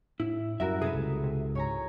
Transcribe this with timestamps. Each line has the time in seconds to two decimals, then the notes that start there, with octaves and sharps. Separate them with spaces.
0.20 A2 E4
0.60 F#2 G3 E4 F#4 A#4 E5
0.82 C3 G#4 A4 B4
0.95 C#2
1.24 C3
1.55 G#2 C#5 G#5 A#5